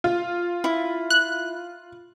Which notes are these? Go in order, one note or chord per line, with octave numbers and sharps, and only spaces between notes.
F4
E4
F#6